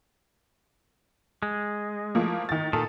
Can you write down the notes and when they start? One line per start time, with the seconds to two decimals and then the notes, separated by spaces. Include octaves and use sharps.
1.43 G#3
2.15 F3 A3 A#3
2.49 D#3 A6
2.73 A#2 D#3 A4